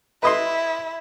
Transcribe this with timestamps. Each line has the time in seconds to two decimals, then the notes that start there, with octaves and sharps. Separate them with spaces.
0.23 E4 B4 D#5 C6